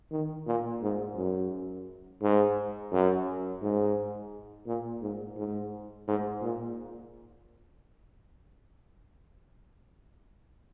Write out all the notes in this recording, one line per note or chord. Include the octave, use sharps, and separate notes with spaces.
D#3
A#2
G#2
F#2
G#2
F#2
G#2
A#2
G#2
G#2
G#2
A#2